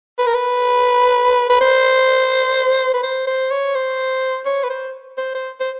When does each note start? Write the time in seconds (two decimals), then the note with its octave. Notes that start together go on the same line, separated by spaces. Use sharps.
0.19 B4
0.27 A#4
0.34 B4
1.50 B4
1.61 C5
2.94 B4
3.03 C5
3.27 C5
3.51 C#5
3.75 C5
4.46 C#5
4.64 B4
4.70 C5
5.17 C5
5.34 C5
5.60 C5